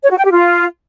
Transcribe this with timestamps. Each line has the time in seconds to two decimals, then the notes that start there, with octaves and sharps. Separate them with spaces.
0.03 C#5
0.10 F#4
0.17 G5
0.24 G4
0.31 F4